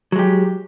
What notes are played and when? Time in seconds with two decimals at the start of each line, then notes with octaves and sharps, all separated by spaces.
0.12 F#3
0.16 G#3
0.19 G4